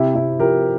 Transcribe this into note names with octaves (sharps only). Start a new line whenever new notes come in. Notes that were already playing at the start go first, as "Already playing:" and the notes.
Already playing: C3 E4 G4
C3 E4 G4
F3 G4 A#4